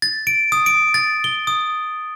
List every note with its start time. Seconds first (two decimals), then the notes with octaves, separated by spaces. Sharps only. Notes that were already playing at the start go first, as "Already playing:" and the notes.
0.02 A6
0.27 D7
0.52 D#6
0.66 D7
0.94 A6
1.24 G7
1.47 D#6